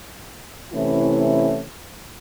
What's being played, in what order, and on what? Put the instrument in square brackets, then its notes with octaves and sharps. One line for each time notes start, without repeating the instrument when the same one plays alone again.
[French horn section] C3 E3 A3 C#4 E4